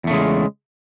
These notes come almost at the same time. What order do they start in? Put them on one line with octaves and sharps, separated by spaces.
E2 A3 C#3 G#3